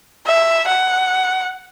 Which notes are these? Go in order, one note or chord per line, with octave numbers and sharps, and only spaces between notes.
E5
F#5